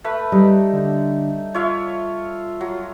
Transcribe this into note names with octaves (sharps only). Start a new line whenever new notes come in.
A3 B4
G3 D#4
D3
F4 C#5 E5 F5
F#3